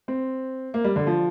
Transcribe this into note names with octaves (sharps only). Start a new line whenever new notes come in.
C4
A#3
G3
D3
F3